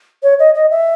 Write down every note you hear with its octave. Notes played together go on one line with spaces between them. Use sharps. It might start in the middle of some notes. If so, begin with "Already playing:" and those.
C#5
D#5
D#5
E5